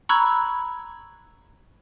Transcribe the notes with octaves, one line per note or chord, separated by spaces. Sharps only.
A#5 B5 C#6 E6 F#6 G#6